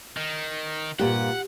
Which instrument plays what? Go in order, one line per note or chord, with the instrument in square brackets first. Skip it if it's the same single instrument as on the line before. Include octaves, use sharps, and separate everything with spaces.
[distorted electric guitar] D#3
[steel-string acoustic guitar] G2 A#2 [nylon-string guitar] G4 [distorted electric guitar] F#5